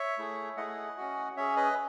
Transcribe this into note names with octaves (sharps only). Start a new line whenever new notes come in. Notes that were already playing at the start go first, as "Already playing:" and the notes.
Already playing: C#5 E5
A3 E4 G#4
A3 E4 G#4 D#5 F#5
C#4 F#4
C#4 G#4 C#5 E5
B4 D#5